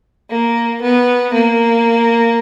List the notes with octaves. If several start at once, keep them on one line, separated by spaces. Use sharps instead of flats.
A#3
B3
A#3